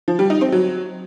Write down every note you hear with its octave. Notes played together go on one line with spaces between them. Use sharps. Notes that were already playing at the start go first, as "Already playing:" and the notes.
F3
G3
D#4
C4
F#3